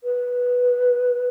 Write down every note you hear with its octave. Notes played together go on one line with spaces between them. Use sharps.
B4